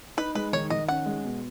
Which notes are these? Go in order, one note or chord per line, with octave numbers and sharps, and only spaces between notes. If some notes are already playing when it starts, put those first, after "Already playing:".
D#4 B4
G#3 B4
D#3 C#5
D#3 D#5
C#4 F#5
G#3
B2